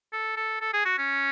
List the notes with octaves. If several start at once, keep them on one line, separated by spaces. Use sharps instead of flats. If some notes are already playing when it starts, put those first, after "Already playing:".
A4
A4
A4
G#4
F#4
C#4